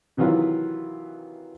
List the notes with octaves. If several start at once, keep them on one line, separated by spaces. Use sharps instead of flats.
C3 D#3 E3 F#3 F4 B4